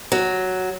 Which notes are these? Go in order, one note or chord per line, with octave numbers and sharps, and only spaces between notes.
F#3